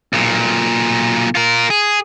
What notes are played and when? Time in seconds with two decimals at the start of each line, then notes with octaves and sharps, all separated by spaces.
0.13 B1 A#2
1.35 F4 A#4
1.70 G#4